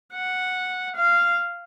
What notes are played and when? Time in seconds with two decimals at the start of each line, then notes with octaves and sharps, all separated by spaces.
0.13 F#5
0.97 F5